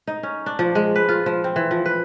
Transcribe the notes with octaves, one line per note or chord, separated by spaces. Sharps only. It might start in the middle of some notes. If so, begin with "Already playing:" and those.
D#4
C#4
D4
F3
G#3
B4
F4
F3
C4
E3
F3
B4